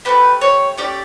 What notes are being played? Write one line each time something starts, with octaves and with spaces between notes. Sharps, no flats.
A3 C#4 G4 B4
C#5
A3 C#4 G4 D5